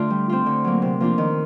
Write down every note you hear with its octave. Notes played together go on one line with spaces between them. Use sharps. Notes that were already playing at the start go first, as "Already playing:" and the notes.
Already playing: D3 A3 D4 F4
G3
C4 F4
D3
F#3 A#3
C3
F3 A#3 D4 F4
D#3